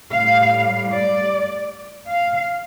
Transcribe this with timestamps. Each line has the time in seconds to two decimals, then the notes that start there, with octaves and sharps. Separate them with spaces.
0.12 A2 G3 F5
0.91 D5
2.09 F5